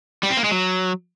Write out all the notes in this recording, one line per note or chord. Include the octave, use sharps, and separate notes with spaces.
G3
C4
A#3
G#3
F#3